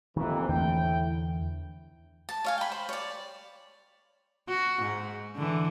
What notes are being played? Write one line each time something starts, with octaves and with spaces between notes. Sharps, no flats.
F2 C3 D#3 E3 A#3
E2 A2 D3 E3 E4 G5
A5
C#5 F5 G#5
G5 B5
C5
C#5 D5
F#4
G#2
D3 E3